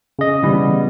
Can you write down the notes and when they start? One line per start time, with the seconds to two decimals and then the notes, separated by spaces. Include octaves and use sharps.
0.19 C#3 D#5
0.44 E3 G3 B3